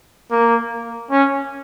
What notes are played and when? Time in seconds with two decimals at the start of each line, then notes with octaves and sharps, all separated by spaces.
0.31 A#3
1.11 C#4